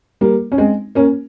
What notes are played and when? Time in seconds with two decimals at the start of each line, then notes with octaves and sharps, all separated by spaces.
0.21 G3 A#3
0.52 C#4
0.58 G#3 C4
0.95 A#3 C#4